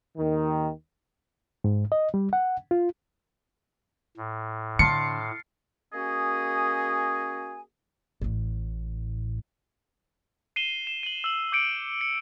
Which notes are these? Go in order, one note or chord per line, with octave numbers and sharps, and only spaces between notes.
D#2 D#3
G#2
D#5
G3
F#5
F4
A2
D3 F5 A5 C6 C#7
A#3 C#4 F#4 G#4 D#5 G#5
A1 A2
C7 D#7 E7 G7
E7
D#7 F#7
E6 F#7
D6 G6 C#7 D7
C#7